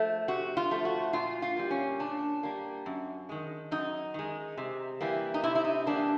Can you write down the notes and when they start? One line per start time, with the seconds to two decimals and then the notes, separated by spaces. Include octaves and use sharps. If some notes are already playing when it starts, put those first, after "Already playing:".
Already playing: F3 A3
0.28 C3 F#4
0.57 F4
0.71 F3 A3
0.85 F#4
1.13 A#2 F4
1.42 F4
1.56 G3 A#3
1.71 C#4
1.99 A#2 D4
2.43 G3 A#3
2.86 F#2
3.29 D#3 G#3
3.71 F#2 D#4
4.14 D#3 G#3
4.58 C3
5.01 E3 G3 A#3
5.34 D#4
5.44 C3 E4
5.55 E4
5.64 D#4
5.87 E3 G3 A#3 D4